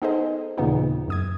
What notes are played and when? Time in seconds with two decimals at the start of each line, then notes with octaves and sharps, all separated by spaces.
0.02 B3 D#4 G#4 A4 C5 D#5
0.58 D#2 A#2 C#3 E3 B3 D#4
1.08 F#2 D#6 G#6